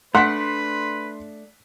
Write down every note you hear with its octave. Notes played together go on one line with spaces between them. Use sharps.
A3 D4 B4 F#5 C6 B6